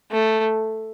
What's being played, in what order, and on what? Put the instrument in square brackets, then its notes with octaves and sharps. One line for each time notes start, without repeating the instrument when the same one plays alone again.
[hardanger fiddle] A3